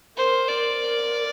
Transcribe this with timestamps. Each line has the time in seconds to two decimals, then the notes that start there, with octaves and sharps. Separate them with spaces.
0.17 A#4 C5
0.48 D5